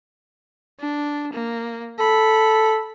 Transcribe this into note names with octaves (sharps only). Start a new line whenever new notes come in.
D4
A#3
A4 B5